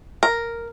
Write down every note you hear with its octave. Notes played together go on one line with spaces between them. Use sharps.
A#4